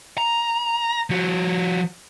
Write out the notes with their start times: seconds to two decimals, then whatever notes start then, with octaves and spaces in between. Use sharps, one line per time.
0.18 A#5
1.10 F3 F#4